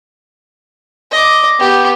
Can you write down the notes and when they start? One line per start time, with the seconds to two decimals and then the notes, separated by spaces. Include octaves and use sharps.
1.11 D#5 D6
1.59 B3 G4